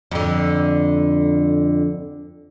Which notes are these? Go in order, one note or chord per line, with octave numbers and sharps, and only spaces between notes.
F2 D3